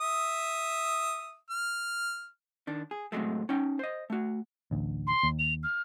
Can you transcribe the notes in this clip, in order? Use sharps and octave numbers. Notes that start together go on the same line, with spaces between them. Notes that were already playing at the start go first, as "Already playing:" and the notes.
E5 D#6
F6
D#3 D4
G#4
A2 C3 F#3 G#3 A3
C#4 D#4 G5
C5 D#5
A3 F#4
A1 D2
C6
D#2
F7
F6